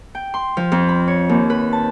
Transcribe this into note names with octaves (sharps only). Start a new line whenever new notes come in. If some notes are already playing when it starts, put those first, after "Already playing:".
G5
C6
F3
F2
B5
C#5
D#2
B4
A5